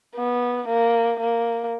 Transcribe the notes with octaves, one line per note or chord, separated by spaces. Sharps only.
B3
A#3
A#3